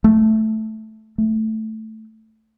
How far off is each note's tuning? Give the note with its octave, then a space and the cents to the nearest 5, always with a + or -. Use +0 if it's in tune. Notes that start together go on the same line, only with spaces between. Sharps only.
A3 -5
A3 +0